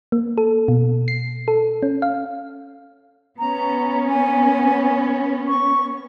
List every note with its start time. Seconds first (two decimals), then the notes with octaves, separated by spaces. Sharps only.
0.12 A#3
0.38 A4
0.68 B2
1.08 C7
1.48 A4
1.83 C#4
2.02 F5
3.39 B3 C#4 A#5
4.10 G#5
5.48 C#6